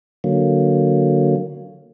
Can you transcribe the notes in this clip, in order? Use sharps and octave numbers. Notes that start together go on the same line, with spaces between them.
D3 F#3 A#3